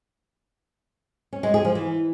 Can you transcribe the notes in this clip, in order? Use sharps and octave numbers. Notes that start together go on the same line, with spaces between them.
C#4
G#3
G#4
F3
E3